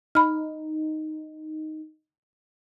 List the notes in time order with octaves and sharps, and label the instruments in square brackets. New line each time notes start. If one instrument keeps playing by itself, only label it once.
[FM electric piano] D#4 [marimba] B5 F6